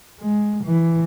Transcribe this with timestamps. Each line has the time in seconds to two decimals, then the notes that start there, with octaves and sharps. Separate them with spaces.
0.20 G#3
0.64 E3